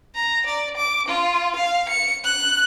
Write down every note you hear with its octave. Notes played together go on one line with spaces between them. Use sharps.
A#5
D5
D6
F4
F5
C#7
F#6